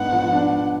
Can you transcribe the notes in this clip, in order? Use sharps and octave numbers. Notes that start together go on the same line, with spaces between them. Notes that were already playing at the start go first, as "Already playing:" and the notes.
Already playing: G#2 B3 D4 F#5
F3
D4
G#2